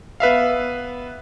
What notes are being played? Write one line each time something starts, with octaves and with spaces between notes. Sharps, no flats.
B3 B4 E5 F5